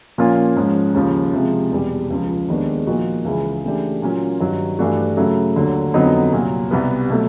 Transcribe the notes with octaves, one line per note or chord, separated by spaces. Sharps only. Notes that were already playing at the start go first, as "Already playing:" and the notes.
A#2 F3 A#3 C#4 F4
G#2 F3 G#3 C#4
D#2 C#3 F3
C3 F3 G#3
E2 B2 G3
C#2 C#3 F3
D#2 D#3 G#3 B3 D4
A#2 F3 A#3 D#4 F#4
C#2 C#3 E3 G#3
C#3 E3 A3 D4 G4
A#2 F#3 A#3 C#4 F4
G2 D#3 F#3
G2 E3 A3 D4 F#4
C#3 F#3 A3
D#2 D3 F#3
F2 D3 F#3 B3 D#4
C2 A#2 F#3
C2 B2 G3 B3
B2 F#3 A3